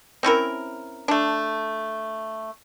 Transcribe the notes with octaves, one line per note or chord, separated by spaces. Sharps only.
C4 C#4 E4 A#4
A3 D4